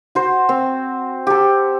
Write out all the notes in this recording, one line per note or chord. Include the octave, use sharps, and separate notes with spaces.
F#4 C5
C4
G4 A4